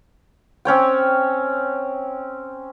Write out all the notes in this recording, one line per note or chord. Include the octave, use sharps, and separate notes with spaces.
C4 C#4 C#5 G5